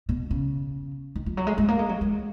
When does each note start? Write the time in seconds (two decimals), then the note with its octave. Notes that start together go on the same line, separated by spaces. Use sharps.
0.09 B2
0.31 C#3
1.15 D#3
1.26 F3
1.37 F#3
1.47 G#3
1.58 G#3
1.68 A#3
1.79 G#3
1.89 F#3
2.01 G#3